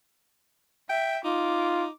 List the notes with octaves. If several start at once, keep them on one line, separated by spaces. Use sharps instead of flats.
E5 G5
D#4 F4 D6